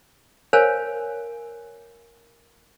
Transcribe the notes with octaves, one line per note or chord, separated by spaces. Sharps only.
A#4 C5 C#5 F5 G#5